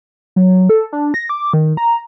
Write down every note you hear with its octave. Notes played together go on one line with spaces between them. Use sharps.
F#3
A4
D4
A#6
D6
D#3
A#5